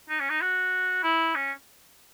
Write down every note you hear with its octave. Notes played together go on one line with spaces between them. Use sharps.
D#4
C#4
D#4
F#4
E4
C#4